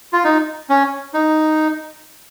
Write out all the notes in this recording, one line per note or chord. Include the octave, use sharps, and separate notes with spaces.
F4
D#4
C#4
D#4